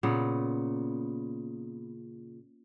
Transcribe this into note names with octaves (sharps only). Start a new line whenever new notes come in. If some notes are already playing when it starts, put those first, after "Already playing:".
A#2 C#3 B3